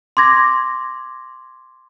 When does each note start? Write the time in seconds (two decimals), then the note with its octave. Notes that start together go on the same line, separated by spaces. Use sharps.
0.17 C6 D6 G#6 A#6